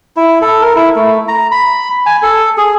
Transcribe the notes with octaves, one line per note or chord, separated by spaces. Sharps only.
E4
A4
A#4
E4
A3
A#5
B5
G#5
A4
G#4